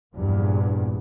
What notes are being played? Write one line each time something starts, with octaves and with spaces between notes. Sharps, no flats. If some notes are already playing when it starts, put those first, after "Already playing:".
A#1 E2 G2 A#2